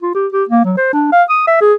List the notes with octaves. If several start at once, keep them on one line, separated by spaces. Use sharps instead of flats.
F4
G4
G4
A#3
F#3
C5
D4
F5
D#6
E5
G#4